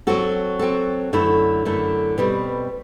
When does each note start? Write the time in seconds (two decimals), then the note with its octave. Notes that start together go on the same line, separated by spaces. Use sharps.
0.07 F#3 C4 F#4 A4
0.59 F#3 C4 F#4 A4
1.13 F#2 D3 A3 E4
1.65 F#2 D3 A3 E4
2.18 B2 G3 C4